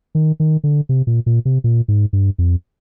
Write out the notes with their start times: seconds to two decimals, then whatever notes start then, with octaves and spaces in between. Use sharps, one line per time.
0.15 D#3
0.40 D#3
0.64 D3
0.89 C3
1.07 A#2
1.26 A#2
1.45 C3
1.64 A#2
1.88 G#2
2.13 G2
2.38 F2